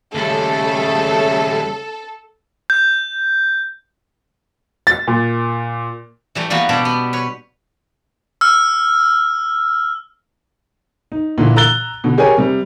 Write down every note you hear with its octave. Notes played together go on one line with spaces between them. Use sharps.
D#2 C#3 G3 A3 A4
G6
A6
A#2
E3 G3 A3
E3 G3 A#3 B3 F#4
B2 D4 G4 D5 A5
B3
B4 C#5
E6 F6
D#4
A#2 D3 E3
A#5 E6 F#6 A6 G7
B2 D3
G4 G#4 A#4 C#5 G#5
C3 G3